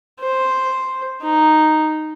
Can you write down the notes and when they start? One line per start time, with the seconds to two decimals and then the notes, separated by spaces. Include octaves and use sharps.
0.20 C5
1.23 D#4